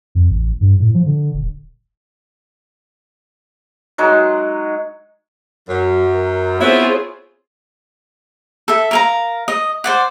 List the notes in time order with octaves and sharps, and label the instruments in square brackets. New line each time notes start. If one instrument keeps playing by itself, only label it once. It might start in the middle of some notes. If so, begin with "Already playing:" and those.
[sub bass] F2
A1
G2
A2
F3
D3
D#1
[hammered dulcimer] F#3 G#3 D#4
[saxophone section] F#2 [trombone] F#3
[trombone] A#4
[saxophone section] B3 E4 [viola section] C4 F4 G#4 [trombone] C#5
[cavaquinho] A4 E5
A#4 F5 A#5
D#5
C5 D5 F#5